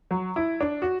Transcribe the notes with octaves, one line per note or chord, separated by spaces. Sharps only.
F#3
E4
D4
F#4